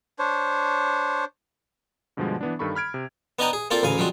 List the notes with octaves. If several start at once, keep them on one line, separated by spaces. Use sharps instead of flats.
D4 C5 C#5
G2 B2 D3 F3 G3 G#3
E3 B3 D4
G2 D#3 A4 B5 C#6
B5 F6 G#6 D7
C3
B3 D4 D#4 D#5 G5 A#5
G#4
A#3 C4 F4 A4 C5 D5
A1 D2 C#3 F5 G#5
F3 F#3 G#3 C4 D4